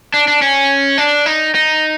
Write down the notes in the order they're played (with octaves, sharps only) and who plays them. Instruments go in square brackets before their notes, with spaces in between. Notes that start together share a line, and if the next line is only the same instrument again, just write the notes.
[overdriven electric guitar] D4
D4
C#4
D4
D#4
D#4